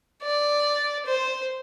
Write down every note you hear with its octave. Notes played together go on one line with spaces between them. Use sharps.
D5
C5